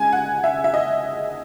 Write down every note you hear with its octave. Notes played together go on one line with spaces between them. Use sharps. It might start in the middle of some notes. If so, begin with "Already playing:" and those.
Already playing: C#3 G#3 G#5
F#5
E5
E5
D#5